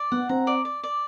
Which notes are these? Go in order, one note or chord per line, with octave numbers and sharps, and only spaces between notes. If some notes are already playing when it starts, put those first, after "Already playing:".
Already playing: D5
B3 F#5
C4 A#5
D5
D5
D5